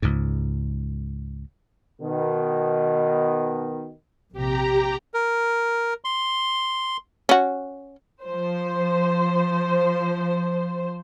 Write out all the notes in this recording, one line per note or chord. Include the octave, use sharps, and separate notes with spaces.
C#2 G#2
B2 D#3
A#1 C3 G4 A#5
A#4
C6
C#4 F#4
F3 C5